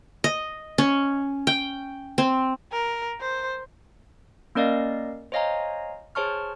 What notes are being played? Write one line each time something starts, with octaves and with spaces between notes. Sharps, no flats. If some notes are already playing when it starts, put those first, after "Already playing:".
D#5
C#4
G5
C4
A#4
C5
A#3 C#4 A#4 D5 D#5 F5
C5 C#5 D#5 F5 G#5 A#5
G#4 C5 C#5 A5 C#6 F6